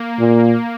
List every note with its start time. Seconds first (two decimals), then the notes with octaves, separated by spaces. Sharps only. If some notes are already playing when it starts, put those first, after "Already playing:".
Already playing: A#3
0.19 A#2